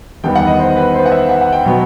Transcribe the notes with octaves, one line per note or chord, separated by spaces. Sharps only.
E2 D#3 G3 B3 G5
F#5
D#5
C5
B4
C5
F#5
E5
F#5
F#5
G5
B2 F#3 B3